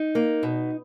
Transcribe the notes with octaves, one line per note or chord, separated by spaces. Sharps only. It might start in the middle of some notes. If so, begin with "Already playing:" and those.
Already playing: D#4
A#3
B2